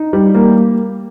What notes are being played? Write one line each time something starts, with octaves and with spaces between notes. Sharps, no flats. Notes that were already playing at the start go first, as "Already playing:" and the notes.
Already playing: D#4
G3
A#3